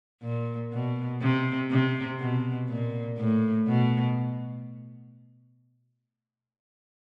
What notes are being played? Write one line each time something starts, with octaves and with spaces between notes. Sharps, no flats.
A#2
B2
C3
C3
B2
A#2
A2
B2